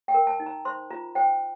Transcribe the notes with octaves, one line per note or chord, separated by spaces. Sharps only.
G5
A#4
A5
D#4
A#5
C5 C6
F4 A#5
C5 G5